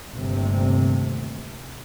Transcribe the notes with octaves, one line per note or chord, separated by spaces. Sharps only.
G1 D#2 C3 A3